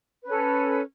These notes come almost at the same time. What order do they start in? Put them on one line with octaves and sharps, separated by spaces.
B4 C#4 A4